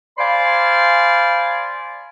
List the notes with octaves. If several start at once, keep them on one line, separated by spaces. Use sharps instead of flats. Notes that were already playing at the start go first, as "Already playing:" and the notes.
C5 D5 F5 G#5 B5 C6